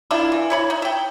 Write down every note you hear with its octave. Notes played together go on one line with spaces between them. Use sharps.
D#3 D4 E4 F4
E3
E4 C#5 B5
D#4
E5 G5